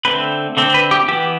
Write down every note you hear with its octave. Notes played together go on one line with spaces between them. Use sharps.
D3 A3 C4 B4
D3 A3 C4
B4
G4
E3 B3 G4